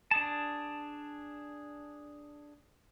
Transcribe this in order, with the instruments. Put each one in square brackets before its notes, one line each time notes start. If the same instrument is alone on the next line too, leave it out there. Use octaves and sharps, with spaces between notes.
[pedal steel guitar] D4 G#4 A5